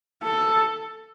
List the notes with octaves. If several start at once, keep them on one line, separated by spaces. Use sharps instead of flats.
A4